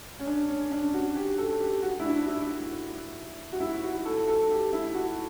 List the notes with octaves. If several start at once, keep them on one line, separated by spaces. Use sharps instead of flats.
C#4
D4
C#4
D4
F#4
G4
A4
G4
F#4
E4
D4
E4
F#4
E4
F#4
A4
A4
G4
E4
F#4